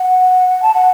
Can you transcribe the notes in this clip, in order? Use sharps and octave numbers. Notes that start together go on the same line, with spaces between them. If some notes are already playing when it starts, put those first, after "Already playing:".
Already playing: F#5
A5
F#5